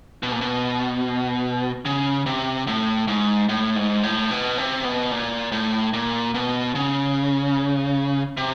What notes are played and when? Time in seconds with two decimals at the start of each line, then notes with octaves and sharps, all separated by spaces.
0.23 B2
0.32 A#2
0.41 B2
1.85 C#3
2.26 C3
2.67 A2
3.08 G#2
3.49 A2
3.76 G#2
4.03 A2
4.31 B2
4.58 C3
4.84 B2
5.12 A#2
5.52 A2
5.93 A#2
6.34 B2
6.75 C#3
8.37 C3